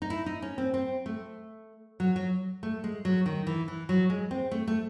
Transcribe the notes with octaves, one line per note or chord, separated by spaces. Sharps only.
D#4
E4
D#4
C#4
C4
C4
A3
F#3
F#3
A3
G#3
F#3
D#3
E3
E3
F#3
G#3
C4
A3
A3